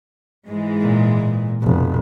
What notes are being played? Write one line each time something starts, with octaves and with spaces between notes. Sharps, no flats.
G#2 E3 G#3
A#2
A#2
F1 B2